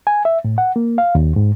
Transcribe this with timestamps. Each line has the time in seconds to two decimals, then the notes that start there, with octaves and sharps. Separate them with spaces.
0.07 G#5
0.25 E5
0.44 A2
0.58 F#5
0.76 A#3
0.98 F5
1.15 D#2
1.36 G#2